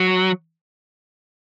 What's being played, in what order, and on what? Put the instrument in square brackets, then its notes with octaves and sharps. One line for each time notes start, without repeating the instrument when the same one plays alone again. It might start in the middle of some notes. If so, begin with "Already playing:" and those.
Already playing: [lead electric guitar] F#3